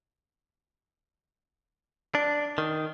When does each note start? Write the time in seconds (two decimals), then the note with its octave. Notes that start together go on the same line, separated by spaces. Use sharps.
2.15 D4
2.58 D#3